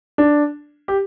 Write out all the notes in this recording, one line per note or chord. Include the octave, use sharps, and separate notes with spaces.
D4
G4